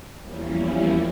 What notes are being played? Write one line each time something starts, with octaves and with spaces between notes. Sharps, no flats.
E2 F3 G3 A#3 C#4 E4